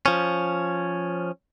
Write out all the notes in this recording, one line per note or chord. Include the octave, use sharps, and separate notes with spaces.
F3 C#4